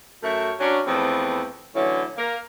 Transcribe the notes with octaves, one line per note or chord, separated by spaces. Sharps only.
F#2 A3 A#4 C#5 E5
F#3 C#4 D4
E2 F3 A3 B3 C4
D3 E3 F#3 A3 C#4 E4
A#3 A#4